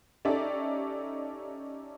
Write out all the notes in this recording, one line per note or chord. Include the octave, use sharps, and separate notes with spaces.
C#4 D#4 G4 A4 D5 E5